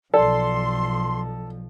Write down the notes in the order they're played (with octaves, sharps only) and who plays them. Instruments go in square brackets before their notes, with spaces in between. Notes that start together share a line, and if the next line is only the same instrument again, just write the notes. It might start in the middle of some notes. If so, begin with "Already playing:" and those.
[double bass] B1 F3 [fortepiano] A4 [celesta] D5 [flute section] C6